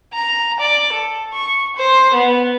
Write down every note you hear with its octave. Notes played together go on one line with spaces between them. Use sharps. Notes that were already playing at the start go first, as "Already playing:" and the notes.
A#5
D5
A4
C#6
C5
B3